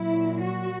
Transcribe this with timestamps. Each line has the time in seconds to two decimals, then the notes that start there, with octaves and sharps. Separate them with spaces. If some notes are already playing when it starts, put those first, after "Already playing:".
Already playing: A#2 F#3 E4
0.41 F#4